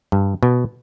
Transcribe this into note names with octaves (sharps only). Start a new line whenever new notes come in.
G2
B2